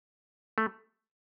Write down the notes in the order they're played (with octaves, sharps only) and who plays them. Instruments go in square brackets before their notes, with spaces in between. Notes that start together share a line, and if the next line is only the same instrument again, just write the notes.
[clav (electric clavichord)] A3